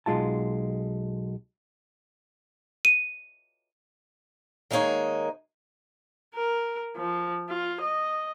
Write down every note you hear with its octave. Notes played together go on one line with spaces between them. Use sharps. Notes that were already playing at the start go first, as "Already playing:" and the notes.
B1 G#3 F4 A5
D#7
D#3 G#3 A#3 D#4 C#5
A#4
F3
F4
D#5